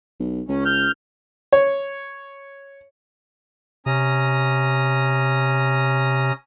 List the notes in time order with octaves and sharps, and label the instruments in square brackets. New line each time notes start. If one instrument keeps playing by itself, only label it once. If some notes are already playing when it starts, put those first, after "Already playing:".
[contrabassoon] B1
[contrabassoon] C#2 [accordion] C#4
[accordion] F6 G6
[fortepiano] C#5
[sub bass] C3 [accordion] C#4 A#5 D#6